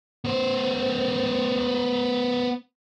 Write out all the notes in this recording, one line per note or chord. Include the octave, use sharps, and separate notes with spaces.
B3 C5